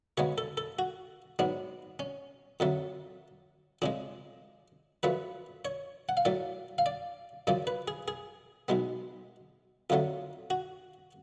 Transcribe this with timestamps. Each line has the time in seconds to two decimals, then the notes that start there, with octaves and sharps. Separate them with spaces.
0.17 D2 C#3 G#3 B3 C#5
0.38 A4
0.57 A4
0.79 F#4
1.39 G#2 F#3 B3 D4
1.99 C#4
2.60 F2 D3 F#3 A3
3.82 F2 C#3 G#3 D4
5.03 F#2 F3 A3 B4
5.65 C#5
6.09 F#5
6.17 F5
6.25 A2 F#3 A3 D5
6.78 F5
6.86 D5
7.47 F#2 C#3 F3 D5
7.67 B4
7.88 G#4
8.08 G#4
8.68 B1 B2 G#3 B3
9.90 F2 D3 F#3 A3 F4
10.50 F#4